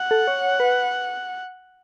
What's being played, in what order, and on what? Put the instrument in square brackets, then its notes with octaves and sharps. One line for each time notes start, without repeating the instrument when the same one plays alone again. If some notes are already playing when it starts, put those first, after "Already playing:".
Already playing: [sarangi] F#5
[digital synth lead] A4
C#5
B4